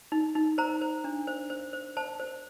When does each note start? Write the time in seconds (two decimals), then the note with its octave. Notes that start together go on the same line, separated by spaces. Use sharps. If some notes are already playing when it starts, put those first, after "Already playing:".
0.12 D#4
0.35 D#4
0.58 C5 A#5
0.82 C5
1.04 D4
1.27 C5
1.50 C5
1.73 C5
1.97 C5 A5
2.20 C5